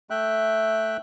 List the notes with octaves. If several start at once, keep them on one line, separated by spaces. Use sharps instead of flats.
A3 E5 G5 F#6